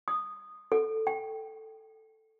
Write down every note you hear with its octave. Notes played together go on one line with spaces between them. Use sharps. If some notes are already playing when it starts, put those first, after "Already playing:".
D#6
A4
G5